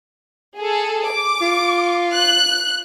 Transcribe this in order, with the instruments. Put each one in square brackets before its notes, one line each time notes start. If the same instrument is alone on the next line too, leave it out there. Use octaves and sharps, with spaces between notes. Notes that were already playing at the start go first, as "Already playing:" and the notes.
[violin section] G#4 A4
D6
[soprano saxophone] F4
[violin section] F#6